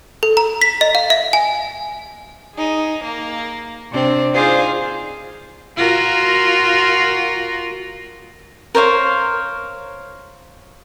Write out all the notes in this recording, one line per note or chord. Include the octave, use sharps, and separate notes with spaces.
A4
A#5
B6
D#5
F5
E5
G#5
D#4 G#4
A#3
C3 C4 D4
D#4 F4 G#4 C5 D5 F5
F4 F#4 A#4
A#4 C5 C#5 F5